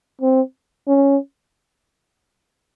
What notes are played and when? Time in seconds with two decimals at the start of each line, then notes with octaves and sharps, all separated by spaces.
0.21 C4
0.87 C#4